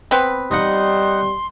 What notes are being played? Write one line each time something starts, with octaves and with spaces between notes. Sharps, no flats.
B3 C4 B4
G3 D#4 F#5 C6